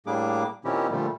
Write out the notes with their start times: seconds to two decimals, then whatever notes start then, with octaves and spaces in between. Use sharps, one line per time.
0.06 A2 G3 A#3 D4 G#4 D6
0.65 A#2 D#3 C4 C#4 E4 G4
0.91 A#2 D3 F3 G3 A3